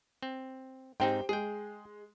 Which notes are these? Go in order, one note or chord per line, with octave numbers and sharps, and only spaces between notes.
C4
G#2 C4 D#4 G4 C5 G5
G#3 G#4 G5